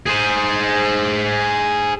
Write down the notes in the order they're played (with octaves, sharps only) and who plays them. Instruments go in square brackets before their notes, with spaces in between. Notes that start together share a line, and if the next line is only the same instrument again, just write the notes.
[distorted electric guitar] G#4 C5